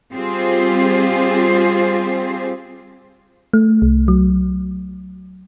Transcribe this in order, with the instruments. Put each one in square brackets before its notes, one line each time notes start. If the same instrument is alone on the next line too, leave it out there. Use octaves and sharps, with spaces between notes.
[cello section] G3 C4 F4 G4 G#4 C5
[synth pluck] A3
C2
F#3